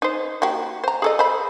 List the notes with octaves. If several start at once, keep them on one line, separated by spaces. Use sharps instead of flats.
D#4 C5
A#3 F#4 G4
C5 A#5
G#4 A4 D#5
C5 B5